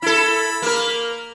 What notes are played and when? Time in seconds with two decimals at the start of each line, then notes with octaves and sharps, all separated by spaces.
0.02 E4 A4 B5
0.62 A#3 A#4